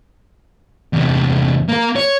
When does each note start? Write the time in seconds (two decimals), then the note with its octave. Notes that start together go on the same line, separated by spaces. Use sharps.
0.93 E2 C3
1.68 A#3 A#4
1.96 C#5